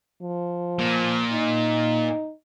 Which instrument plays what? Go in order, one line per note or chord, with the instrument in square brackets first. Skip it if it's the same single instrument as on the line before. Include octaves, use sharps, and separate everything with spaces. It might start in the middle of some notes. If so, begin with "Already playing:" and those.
[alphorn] F3
[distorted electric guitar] A#2
[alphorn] D#4